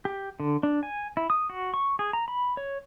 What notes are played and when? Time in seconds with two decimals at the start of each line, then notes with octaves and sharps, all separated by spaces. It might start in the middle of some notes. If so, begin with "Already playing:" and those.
0.05 G4
0.40 D3
0.63 D4
0.83 G#5
1.17 E4
1.30 D#6
1.50 F#4
1.74 C#6
1.99 G#4
2.13 A#5
2.28 B5
2.57 C#5